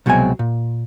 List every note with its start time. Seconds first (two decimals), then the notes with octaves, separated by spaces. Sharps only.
0.06 C2 B2 F#3 G#3 C4 G#5
0.39 A#2